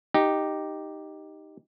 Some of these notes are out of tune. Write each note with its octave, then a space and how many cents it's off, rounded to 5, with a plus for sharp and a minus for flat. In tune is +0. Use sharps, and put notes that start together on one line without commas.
D#4 +0 G4 +0